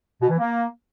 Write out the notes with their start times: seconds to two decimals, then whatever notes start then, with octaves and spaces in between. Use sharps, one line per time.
0.21 B2
0.30 E3
0.38 A#3